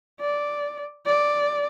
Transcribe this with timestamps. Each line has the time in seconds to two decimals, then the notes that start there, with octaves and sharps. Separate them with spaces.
0.20 D5
1.06 D5